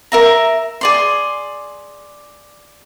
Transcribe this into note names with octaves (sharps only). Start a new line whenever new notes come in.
A#4 E5 A#5
G#4 D5 C6